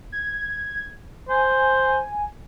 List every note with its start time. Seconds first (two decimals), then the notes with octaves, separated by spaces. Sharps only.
0.12 G#6
1.29 C5 G#5